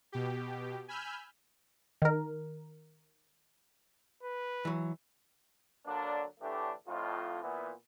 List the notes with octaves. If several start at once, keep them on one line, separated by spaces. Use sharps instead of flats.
B2 G4
G#5 B5 E6 F6 G6
D#3 A#4
B4
E3 F#3
D3 F#3 A#3 D4
A2 D3 E3 A3 D4 G4
F2 A2 F4
A#2 E3 B3